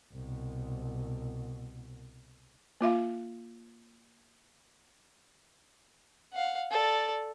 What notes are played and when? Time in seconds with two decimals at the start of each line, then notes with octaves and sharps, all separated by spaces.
0.13 C2 B2
2.81 A#3 F4 E5 F5
6.33 F5 F#5
6.71 A4 D5